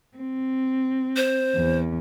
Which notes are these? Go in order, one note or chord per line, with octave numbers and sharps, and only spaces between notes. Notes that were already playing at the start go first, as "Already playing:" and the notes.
C4
C5
E2